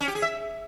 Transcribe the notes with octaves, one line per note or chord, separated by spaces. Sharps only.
C#4
G4
G#4
E5